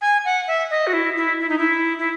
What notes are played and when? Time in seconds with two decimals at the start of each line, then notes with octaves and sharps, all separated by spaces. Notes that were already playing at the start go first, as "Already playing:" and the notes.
0.01 G#5
0.25 F#5
0.48 E5
0.71 D#5
0.87 F#4
0.93 E4
1.17 E4
1.40 E4
1.49 D#4
1.58 E4
1.99 E4